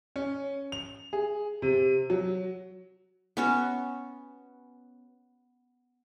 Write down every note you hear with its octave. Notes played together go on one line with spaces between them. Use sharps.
C#4
F7
G#4
C3
F#3
B3 C#4 F#4